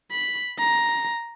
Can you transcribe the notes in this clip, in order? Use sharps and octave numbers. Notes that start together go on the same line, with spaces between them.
B5
A#5